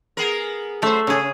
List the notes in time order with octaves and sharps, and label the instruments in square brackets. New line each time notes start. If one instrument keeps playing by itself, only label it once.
[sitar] B3 G#4 A#4
[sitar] F#2 C5 [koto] A3 A4
[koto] C#3 G#4 [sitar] C#4